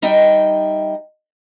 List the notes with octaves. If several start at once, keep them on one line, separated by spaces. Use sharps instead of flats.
G3 D#4 D#5 E5 G5